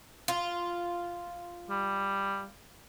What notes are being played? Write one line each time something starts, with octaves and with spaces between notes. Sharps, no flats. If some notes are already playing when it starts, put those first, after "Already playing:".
F4
G3